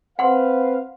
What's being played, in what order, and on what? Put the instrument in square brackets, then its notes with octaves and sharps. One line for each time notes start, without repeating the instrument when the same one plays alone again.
[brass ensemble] C4 B4 F5 [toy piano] F#5 C6